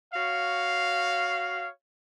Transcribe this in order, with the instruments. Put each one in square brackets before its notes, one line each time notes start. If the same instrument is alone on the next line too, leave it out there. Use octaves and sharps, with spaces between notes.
[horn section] F#4 C#5 F5